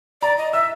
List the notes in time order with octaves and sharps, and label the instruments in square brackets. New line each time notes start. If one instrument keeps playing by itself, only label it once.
[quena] D5 [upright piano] A#5
[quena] D#5
[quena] E5 [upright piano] E6